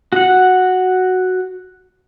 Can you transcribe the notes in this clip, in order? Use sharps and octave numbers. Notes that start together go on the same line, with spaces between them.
F#4 F#5